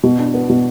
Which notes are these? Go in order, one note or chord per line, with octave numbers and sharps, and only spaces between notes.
B2
D4
B3
B2